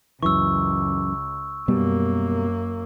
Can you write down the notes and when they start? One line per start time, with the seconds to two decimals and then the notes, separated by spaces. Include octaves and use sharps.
0.23 C#2 F#2 E3 C#6 E6
1.68 F#2 B2 G3 A#3 B3